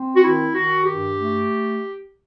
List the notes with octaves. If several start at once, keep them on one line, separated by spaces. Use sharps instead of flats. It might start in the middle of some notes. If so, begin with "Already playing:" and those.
Already playing: C4
F#4
D#3 E4
D#3 F#4
G2 G4
A3